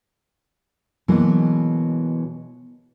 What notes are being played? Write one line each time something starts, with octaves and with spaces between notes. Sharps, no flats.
B2 E3 F#3 G#3 A#3